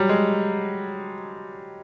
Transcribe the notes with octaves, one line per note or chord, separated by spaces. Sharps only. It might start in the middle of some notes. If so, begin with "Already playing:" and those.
Already playing: F#3 G3
G#3